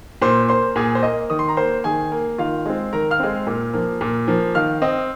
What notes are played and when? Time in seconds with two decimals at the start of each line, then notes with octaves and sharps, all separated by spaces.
0.22 A#2 C5 C6
0.49 A#3 C5 C6
0.76 A#2 G#4 G#5
0.95 C5
1.03 A#3 D#5
1.30 D#3 D#6
1.39 C6
1.49 A#5
1.57 A#3 C5 C6
1.84 D#3 G#4 G#5
2.12 A#3
2.38 D#3 F4 F5
2.66 G#3 C4
2.93 D#3 A#4 A#5
3.11 F5 F6
3.20 G#3 C4
3.47 A#2
3.74 F3 A#3
4.01 A#2
4.28 F3 A#3
4.55 D#3 F5 F6
4.82 C4 D#5 D#6